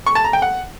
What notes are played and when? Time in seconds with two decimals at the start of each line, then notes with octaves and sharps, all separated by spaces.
0.06 C#6
0.15 A5
0.24 A#5
0.33 G5
0.42 F#5